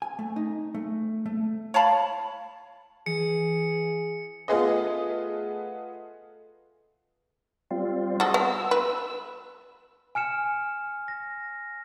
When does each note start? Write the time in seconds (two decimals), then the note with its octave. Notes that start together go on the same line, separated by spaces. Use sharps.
0.02 G#5
0.19 A3
0.36 D#4
0.74 A3
1.26 A3
1.74 C#5 F5 A5 B5
3.06 E3 G#4 C#7
4.48 A3 B3 F4 G#4 B4 D#5
7.71 G3 C4 F4
8.20 F#4 G#4 A4 D#5
8.34 B3 E6
8.71 B4
10.15 G#5 F6 C#7 E7
11.08 A#6